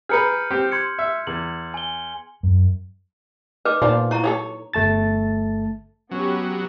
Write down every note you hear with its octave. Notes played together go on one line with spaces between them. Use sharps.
G#4 A#4 B4 F6 G6 C#7
C4 G4
C6 G#6 C#7
E5
E2 F#7
G#5 G7
F#2
D#4 B4 D6
A#2 B3 D4 D#4 C5 F5
E4 F4 A#5 C#6
F#3 G#4 A4 C#5
G1 A3 A5 A6
F#3 B3 C#4 F#4 G4